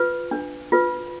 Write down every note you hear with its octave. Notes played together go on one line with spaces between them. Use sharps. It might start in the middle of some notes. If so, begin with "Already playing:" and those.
Already playing: F4 B4
D4
F4 B4